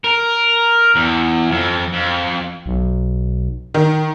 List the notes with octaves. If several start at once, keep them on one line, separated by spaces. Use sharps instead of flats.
A#4
E2
F2
F2
B1
D#3